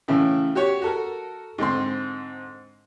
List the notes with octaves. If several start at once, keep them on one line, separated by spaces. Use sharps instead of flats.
A2 C#3 E3
F#4 G4 C#5
F#4 A4 A#4
G#2 D3 C4 C6